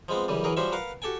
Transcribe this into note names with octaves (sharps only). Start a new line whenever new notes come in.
F3 G#3 B3 C4
F#2 C#3 E3 G3
E3 F#3 G#4 A#4
F3 G3 C#4 F#4 C5 E5
A#4 B4 F5 F#5
F#4 G4 A4 G5 G#5